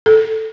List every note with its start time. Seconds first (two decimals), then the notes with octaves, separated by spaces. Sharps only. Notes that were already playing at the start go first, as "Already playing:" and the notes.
0.06 A4